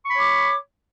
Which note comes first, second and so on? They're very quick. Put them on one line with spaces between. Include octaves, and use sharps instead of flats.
C#6 B5 C#5 D6